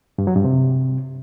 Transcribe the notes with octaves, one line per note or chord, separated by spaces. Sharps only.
G2
F#3
G2
C3